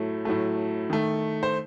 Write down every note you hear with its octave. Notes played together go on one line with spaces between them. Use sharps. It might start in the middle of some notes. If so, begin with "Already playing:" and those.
Already playing: A2 F#3 A3
A2 F#3 A3
D#3 A3
C5